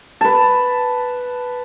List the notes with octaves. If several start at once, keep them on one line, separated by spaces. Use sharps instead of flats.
B4 A5